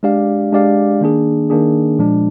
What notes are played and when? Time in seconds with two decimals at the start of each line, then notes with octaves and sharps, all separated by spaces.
0.03 G#3 D4 G4 D5 F5
0.52 G#3 D4 G4 D5 F5
1.01 D#3 A#3 D4 G#4
1.50 D#3 A#3 D4 G#4
1.99 A#2 F3 G#3 D4